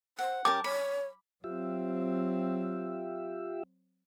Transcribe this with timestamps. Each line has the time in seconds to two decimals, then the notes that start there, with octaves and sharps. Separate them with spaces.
0.19 C5 F#5
0.45 C#4 G4 A#4 A5 D6
0.64 C#5 B5
1.44 F#3 C4 F4 G4 E5